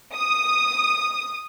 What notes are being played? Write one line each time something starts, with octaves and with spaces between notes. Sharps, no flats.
D#6